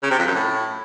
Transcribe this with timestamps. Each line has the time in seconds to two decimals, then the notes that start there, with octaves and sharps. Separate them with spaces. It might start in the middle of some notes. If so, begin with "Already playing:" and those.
0.03 C#3
0.11 C3
0.19 F2
0.27 F#2
0.35 A2